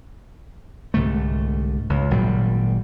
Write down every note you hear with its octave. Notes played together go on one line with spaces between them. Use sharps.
C2 G#2 D3 A3
C#2
G#1 A#2 F#3 G3